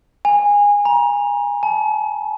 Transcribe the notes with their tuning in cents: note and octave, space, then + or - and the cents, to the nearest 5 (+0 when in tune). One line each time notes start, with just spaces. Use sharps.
G#5 -20
A#5 +30
A5 -40